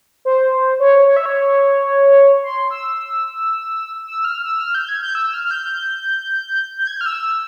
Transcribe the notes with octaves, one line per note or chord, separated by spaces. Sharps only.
C5
C#5
C#5
E5
C#5
C6
E6
E6
F6
E6
F6
G6
G#6
G6
E6
F6
F6
G6
G6
G#6
G6
F6
E6